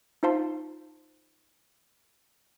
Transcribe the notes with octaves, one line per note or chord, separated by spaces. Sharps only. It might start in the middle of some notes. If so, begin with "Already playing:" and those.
D#4 F4 C5 F5 A5 C6